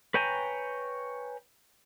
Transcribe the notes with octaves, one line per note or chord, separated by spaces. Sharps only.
B4 C#5 G5 G#5 A#5